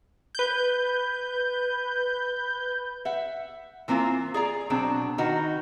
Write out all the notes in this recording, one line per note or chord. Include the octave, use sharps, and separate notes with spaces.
B4 G6
E5 F#5
E3 A#3 C4 E4 F4
G#4 D5 A#5
B2 F#3 C4 D4
D#3 D#4 F#4 B4